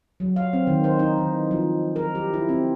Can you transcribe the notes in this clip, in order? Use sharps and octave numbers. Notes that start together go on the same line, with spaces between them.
F#3
F5
C4
D#3
C5
D#4
E3
F3
A#4
G4
E4
C4